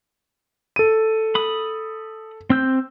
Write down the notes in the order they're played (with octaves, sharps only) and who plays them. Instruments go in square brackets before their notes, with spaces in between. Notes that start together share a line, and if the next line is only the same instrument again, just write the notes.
[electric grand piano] A4 D#7
[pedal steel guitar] B5 D#6
C4 E6 G6